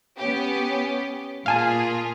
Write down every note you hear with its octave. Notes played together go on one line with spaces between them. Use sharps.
B3 C#4 G4
A#2 F4 G#4 F5 G#5 A5